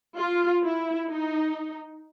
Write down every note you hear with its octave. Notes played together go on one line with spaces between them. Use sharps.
F4
E4
D#4